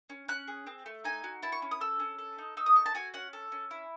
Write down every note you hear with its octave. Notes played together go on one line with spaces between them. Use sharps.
C#4
C#4 F#6
G#4
C4
A3
D#4 G#5
F#4
E4 A5
C#6
C#4
D#6
A4 E6
C#4
A4
D#4
D#4 E6
D#6
A4 C#6
A5
F#4 G#5
C#4 F#5
A4
C#4
E4